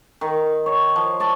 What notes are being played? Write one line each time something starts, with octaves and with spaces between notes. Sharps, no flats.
D#3
C#5
F3
D5 A5 B5 C#6